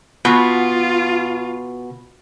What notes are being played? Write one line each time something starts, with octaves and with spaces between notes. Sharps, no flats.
B2 F4